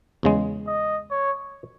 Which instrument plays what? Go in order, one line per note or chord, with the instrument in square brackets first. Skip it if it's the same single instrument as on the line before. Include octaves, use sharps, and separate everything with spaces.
[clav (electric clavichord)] E2 C#3 G#3
[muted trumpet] D#5
C#5